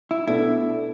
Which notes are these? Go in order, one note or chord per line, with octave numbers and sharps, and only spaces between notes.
E4
B2 A3 D4 E4 A4